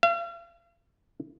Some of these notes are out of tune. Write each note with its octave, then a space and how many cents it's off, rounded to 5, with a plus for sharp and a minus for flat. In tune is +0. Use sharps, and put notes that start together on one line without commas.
F5 -40